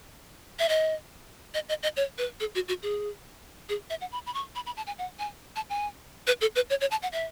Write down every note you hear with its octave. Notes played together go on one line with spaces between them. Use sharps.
E5
D#5
D#5
D#5
D#5
C#5
B4
A4
F#4
F#4
G#4
G#4
E5
F#5
B5
B5
C#6
B5
B5
A5
G#5
F#5
G#5
A5
G#5
B4
A4
B4
C#5
C#5
A5
F#5
E5